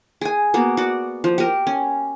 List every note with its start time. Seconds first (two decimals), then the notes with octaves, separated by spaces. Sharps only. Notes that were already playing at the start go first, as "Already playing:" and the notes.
0.21 G#4 G#5
0.54 A#3 B3 F#4
0.77 F#4 D5
1.24 F3
1.38 G4 A#4
1.67 C#4